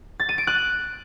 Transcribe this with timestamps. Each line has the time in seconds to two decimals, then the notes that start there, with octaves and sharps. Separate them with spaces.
0.20 A6
0.29 D#7
0.38 D7
0.47 F#6